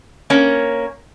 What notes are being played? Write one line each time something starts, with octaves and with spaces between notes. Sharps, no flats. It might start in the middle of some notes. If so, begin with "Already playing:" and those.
A#3 C#4